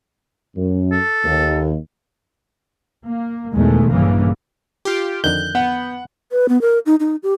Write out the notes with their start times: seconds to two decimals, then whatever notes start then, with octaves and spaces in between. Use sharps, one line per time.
0.56 F#2
0.92 A4
1.25 D#2
3.06 A#3
3.53 E2 B2 D#3 G#3 A3
3.90 A#1 G2 C#3 E3 A#3
4.85 F4 G4
5.24 F2 D3 D#3 F#6 G6
5.55 B3 F#5
6.32 B4
6.49 B3
6.61 A#4
6.86 D#4
7.00 D#4
7.23 G4